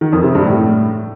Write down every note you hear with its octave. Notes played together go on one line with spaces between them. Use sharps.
D#3
F2
C3
G2
A2